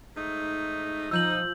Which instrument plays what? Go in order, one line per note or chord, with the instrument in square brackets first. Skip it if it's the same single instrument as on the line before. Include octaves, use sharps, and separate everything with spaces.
[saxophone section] G#2 A3 D#4
[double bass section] F3 [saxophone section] D#4 [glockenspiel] E6 G6 F#7